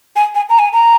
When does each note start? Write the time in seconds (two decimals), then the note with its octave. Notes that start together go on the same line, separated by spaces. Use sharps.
0.16 G#5
0.35 G#5
0.50 A#5
0.59 G#5
0.73 A#5